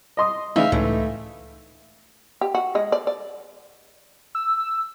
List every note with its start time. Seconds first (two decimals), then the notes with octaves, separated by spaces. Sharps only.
0.17 D#5 C6 D#6
0.56 C#3 E3 A3 D#4 E5 F5
0.72 C#2 A2 E3 A3
2.41 G4
2.55 F#4
2.75 G#3 D#5
2.92 D5
3.07 D5
4.35 E6